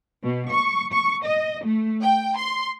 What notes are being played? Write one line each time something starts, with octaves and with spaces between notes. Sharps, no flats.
B2
C#6
C#6
D#5
A3
G5
C6